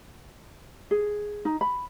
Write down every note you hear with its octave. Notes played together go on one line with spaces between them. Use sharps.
G#4
D#4
B5